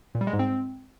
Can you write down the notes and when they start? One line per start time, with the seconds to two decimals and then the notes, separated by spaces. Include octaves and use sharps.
0.15 A#2
0.21 G3
0.27 G#3
0.33 G#2
0.39 C4